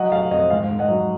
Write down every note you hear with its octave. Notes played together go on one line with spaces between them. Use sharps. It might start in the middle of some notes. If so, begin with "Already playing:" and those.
Already playing: F#3 D#5 F#5
F1 F5
F2 D#5
G#2 F5
G#2
D#5 F#5
F#3